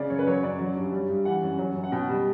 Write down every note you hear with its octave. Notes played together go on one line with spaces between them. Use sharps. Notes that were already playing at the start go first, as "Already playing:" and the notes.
Already playing: C#3 D5
F#2 C#5
B4
F#3 C#5
F#2 D5
F#3
G2
G3
G2
E3 F#5
F#2
F#3
F#2
F#5
B2 G5
G3